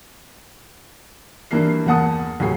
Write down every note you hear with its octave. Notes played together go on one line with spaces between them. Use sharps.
G2 E3 A#3 A#4 C7
E2 A#3 F#5 A5 D#6 C#7
D#2 A2 F#3 F#4 G#4 C7